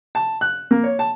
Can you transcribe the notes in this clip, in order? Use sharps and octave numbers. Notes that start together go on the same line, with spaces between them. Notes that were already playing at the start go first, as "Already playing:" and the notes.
A5
F#6
A#3
C#5
A5